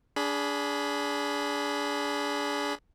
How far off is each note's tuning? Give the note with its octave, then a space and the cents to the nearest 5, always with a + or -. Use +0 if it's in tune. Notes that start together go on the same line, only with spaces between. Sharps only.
D4 -25 G#4 +0 B5 +0